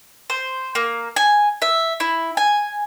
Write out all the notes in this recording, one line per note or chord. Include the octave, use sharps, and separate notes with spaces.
C5
A#3
G#5
E5
E4
G#5